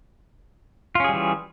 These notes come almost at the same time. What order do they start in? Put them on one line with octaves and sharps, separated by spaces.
F4 C#4 G#4 G3 E3